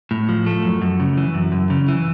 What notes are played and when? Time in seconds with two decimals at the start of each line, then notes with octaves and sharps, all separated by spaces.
0.11 A2
0.29 F3
0.46 A3
0.63 F#2
0.82 F#2
1.00 C#3
1.17 E3
1.35 F#2
1.52 F#2
1.70 C#3
1.88 E3